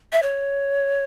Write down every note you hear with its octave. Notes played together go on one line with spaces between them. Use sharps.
E5
C#5